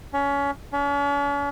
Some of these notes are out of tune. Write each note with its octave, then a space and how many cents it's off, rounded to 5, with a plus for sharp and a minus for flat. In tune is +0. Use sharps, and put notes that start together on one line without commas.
C#4 +25
C#4 +45